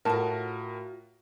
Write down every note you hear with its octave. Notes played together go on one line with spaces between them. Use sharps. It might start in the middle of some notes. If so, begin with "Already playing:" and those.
A2 F4 F#4 A#4 E5 A5